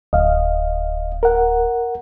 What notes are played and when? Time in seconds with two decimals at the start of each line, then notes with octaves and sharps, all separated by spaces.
0.13 D1 D#5 F5
1.23 A#4 F#5